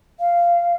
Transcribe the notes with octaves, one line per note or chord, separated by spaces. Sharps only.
F5